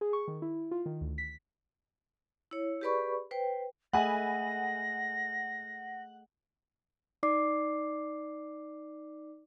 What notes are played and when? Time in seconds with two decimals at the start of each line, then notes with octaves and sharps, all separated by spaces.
0.01 G#4
0.13 C#6
0.28 D#3
0.42 E4
0.71 F4
0.86 D#3
1.01 D2
1.18 B6
2.51 E4 C#5
2.81 G4 G#4 B4 D5 B5 C#6
3.31 B4 C5 G5
3.93 A3 G#4 D#5 E5 F#5 G#5 B5 A#6
7.23 D#4 D5 D6 C7